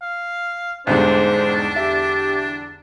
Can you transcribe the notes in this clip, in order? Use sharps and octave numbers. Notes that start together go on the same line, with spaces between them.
F5
B1 E2 G#2 D3 G3 D4 C5
G4 E5